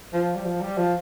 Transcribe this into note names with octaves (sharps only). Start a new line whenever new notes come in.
F3
G3
F3
G3
F3